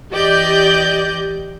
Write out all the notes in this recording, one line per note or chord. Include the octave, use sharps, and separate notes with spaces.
E3 G4 D5 D#5 G6